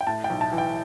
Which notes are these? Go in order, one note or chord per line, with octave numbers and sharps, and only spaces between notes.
G5
A2 A5
G5
B1
A5
E3
G5